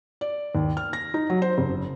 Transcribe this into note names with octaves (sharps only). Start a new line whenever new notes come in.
D5
D#2
F6
A#6
D#4
F#3
C5
F#1